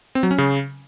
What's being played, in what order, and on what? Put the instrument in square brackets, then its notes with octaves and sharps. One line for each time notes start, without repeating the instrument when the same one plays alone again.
[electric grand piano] C4
F#3
C#4
C#3